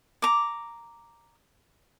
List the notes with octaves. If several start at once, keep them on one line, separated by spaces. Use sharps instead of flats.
A#5 D6